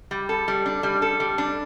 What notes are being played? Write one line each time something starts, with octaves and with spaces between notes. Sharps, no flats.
G3
A4
G3
D4
G3
A4
G3
D4